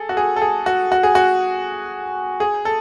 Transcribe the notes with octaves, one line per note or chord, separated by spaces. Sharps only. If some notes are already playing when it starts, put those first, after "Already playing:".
Already playing: G#4 A4
F#4
G#4
A4
G#4
F#4
F#4
G#4
F#4
G#4
A4